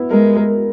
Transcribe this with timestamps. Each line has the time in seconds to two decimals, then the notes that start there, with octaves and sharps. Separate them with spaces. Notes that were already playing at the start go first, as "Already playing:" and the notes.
Already playing: B3 E4
0.10 G#3 A#4
0.36 A#4